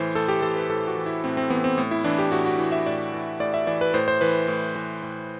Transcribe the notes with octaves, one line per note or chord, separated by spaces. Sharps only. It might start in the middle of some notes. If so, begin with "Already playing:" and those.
Already playing: A2 E3 C5
A2 A4
G4
E3 A4
B4
A2 A4
F#4
E3
E4
A2 C4
C4
E3 B3
C4
A2
E4
E3 D4
G4
A2 F#4
F#4
E3
E5
A2 D5
E3
A2 D5
E5
E3 D5
B4
A2 C5
C5
E3 B4
A2
E3
A2